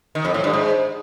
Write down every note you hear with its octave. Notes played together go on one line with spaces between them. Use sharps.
D#3
F2
A2
G2
G#2